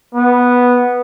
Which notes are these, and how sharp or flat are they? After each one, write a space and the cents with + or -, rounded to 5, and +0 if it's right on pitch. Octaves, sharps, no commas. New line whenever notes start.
B3 -5